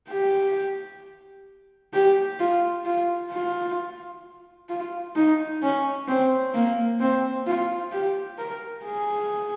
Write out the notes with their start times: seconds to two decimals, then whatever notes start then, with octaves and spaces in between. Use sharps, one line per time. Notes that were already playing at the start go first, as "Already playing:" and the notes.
0.09 G4
1.93 G4
2.40 F4
2.86 F4
3.31 F4
4.69 F4
5.16 D#4
5.62 C#4
6.08 C4
6.54 A#3
7.00 C4
7.46 F4
7.92 G4
8.38 A#4
8.85 G#4